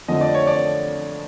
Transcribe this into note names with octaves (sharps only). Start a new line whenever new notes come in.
F2 D3 F3 A3 D#5
D5
C#5
D5